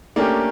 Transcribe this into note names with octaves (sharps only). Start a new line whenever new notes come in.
A3 A#3 C#4 D4 G4